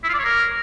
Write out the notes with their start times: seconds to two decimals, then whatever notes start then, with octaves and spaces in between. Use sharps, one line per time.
0.04 E4
0.09 F4
0.14 D5
0.19 C#5
0.24 A#4